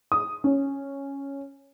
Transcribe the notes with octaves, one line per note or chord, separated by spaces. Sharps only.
D#6
C#4